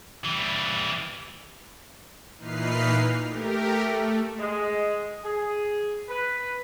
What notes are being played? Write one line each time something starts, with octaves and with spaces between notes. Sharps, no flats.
E3 G3
A#2 E3 D#4 B4 F6 C7
A3 G4 A#4
A3
G#3
G#4
B4